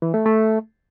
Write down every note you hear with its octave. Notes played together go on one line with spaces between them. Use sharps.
E3
A3
A3